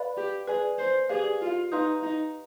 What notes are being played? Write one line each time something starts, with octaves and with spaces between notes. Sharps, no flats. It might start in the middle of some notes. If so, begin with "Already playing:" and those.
Already playing: B4 D5 F5 B5
G4
G#4 B4 D5 G#5
C5
G4 G#4 B4 D5 F5
F4
D#4 B4 F5 C6 D#6 G6
D#4